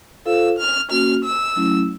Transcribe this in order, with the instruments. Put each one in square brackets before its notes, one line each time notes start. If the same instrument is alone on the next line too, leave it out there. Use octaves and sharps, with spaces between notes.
[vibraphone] F4 A4 C5 F5 [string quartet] E6
[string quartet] F6
[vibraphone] A#3 C#4 F#4 [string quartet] F6
[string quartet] E6
[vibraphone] F#3 A3 C#4 E4